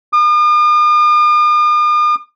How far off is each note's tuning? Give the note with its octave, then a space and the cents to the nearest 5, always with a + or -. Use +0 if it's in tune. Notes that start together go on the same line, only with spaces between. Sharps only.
D#6 -45